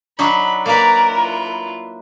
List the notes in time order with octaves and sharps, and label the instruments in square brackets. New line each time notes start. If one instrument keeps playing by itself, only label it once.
[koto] F#3 D4 D#4 [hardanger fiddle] B5
[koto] A#3 B4 [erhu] A#4 [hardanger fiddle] D5 A#5
[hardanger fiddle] E4 F4